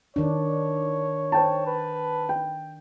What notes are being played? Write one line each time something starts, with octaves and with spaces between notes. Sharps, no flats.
D#3 D4 C#5
C5 G5 A5
B4
G5